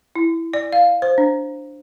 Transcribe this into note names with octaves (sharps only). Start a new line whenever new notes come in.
E4
D5
F5
C5
D4